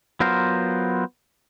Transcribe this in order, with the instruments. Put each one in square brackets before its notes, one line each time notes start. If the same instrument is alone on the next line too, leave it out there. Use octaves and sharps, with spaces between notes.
[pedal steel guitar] F#3 B3 F4 A#4 C5